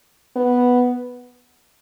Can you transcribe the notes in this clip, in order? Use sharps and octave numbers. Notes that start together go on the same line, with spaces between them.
B3